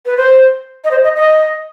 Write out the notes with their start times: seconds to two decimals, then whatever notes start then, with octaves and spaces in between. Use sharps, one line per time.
0.06 B4
0.17 C5
0.84 D#5
0.91 C5
1.04 D#5
1.16 D#5